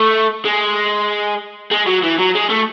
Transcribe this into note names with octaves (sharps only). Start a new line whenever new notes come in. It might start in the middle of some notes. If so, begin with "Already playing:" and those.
Already playing: A3
G#3
G#3
F#3
E3
F#3
G#3
A3